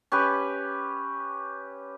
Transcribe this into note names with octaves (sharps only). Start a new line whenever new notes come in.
C#4 G4 B4